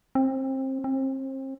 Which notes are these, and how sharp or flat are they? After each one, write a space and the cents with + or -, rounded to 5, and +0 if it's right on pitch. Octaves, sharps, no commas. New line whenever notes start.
C4 +25
C4 +35